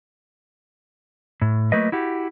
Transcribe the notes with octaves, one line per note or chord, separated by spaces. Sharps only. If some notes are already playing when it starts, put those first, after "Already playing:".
A2
F#3 A3 A#3 B4 D#5
E4 F#4 G4